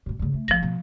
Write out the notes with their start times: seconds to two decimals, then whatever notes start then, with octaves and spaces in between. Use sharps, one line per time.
0.06 G2 B2
0.19 G2 C#3
0.34 A3
0.48 G#1 G#2 F3 A#6
0.62 B2